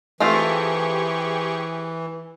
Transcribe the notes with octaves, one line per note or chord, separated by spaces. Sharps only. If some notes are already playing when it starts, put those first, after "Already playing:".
E3 A3 C4 F4 G4 G#4 C#6